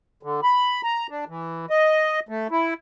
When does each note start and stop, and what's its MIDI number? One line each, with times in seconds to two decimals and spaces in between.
0.23 0.41 50
0.43 0.81 83
0.83 1.07 82
1.10 1.25 62
1.28 1.66 52
1.70 2.20 75
2.29 2.47 57
2.51 2.74 64